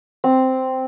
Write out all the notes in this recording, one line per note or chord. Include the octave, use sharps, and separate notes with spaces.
C4